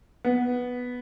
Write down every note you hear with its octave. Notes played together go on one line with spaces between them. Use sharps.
B3